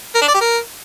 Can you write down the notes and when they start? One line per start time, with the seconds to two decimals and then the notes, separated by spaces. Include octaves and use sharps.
0.15 A#4
0.22 D4
0.28 D5
0.34 G4
0.41 A#4